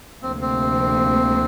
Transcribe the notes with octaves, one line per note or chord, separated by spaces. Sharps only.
D2 C3 F3 A#3 C4
C4